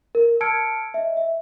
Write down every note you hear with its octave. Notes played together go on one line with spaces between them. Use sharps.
A#4
A5 E6 F6 G#6 C#7 D7
D#5 E5
E5